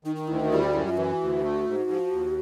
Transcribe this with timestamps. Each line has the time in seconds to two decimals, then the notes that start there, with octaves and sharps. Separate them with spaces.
0.05 D#3 D#4
0.16 D#4
0.28 D2 E4
0.40 D#4
0.52 G3 E4
0.63 F#4
0.74 F#2 E4
0.86 F4
0.97 E3 F#4
1.21 D2
1.43 A3
1.66 G#2
1.90 F3
2.12 D#2